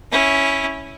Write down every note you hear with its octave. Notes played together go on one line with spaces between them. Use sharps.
C#4 E4